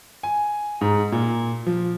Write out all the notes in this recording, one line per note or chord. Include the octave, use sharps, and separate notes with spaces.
G#5
G#2
A#2
F3